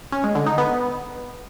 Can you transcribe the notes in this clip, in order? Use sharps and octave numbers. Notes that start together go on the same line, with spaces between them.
C#4
G#3
D3
D#4
B3